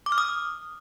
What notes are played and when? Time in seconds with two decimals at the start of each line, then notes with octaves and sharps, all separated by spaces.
0.06 D6
0.12 F6
0.18 D#6